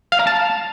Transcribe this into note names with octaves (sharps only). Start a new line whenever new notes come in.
F5
A#5
A5